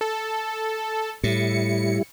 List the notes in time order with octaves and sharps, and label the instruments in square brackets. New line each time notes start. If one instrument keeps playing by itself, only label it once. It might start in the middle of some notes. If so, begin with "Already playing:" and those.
[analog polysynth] A4
[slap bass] A2 [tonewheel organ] G3 E4 [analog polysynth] C#7